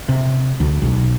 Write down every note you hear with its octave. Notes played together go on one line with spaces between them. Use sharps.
C3
D2
B1